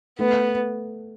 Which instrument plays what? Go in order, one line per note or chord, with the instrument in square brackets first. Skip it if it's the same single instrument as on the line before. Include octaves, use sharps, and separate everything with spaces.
[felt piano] A3 [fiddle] B3